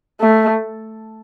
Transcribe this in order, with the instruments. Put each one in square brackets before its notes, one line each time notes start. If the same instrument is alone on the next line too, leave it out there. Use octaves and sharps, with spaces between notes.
[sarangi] A3